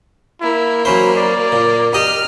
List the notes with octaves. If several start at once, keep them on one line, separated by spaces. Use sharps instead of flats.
A#3 E4
F#3 C#4 C5 B5
D5
A#2
G4 D#5 F6